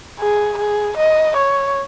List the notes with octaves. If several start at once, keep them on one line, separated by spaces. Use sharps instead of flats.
G#4
G#4
D#5
C#5